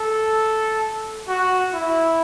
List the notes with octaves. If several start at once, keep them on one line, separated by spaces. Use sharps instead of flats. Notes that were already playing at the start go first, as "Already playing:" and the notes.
Already playing: A4
F#4
E4